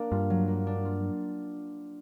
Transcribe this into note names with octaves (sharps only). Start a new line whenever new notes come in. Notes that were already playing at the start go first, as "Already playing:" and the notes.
Already playing: A#3 D4
G2 F4
F#3
A#3
D4
F4